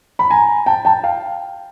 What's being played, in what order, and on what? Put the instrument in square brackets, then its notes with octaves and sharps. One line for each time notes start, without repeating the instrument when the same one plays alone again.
[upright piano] B5
G#5 A#5
G5 A5
G5 A5
F5 G5